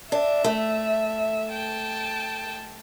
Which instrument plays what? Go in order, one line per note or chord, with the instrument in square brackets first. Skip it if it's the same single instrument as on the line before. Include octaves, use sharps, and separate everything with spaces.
[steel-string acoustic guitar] D4 [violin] E5
[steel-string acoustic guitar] A3
[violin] G5 A5